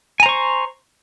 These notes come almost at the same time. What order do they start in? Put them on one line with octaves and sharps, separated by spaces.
G#5 A#5 C5 C#6